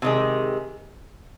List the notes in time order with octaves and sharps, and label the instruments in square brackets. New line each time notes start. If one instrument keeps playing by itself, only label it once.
[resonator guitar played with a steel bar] C3 D#3 G#3